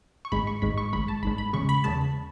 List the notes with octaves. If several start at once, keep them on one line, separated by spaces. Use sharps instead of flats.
C#6
G#1 G#2 G#3 B5
C#6
G#1 G#2 G#3 B5
C#6
G#1 G#2 G#3 B5
A5
G#1 G#2 G#3 B5
B5
E2 C#3 G#3 C#6
B5
E2 C#3 G#3 A5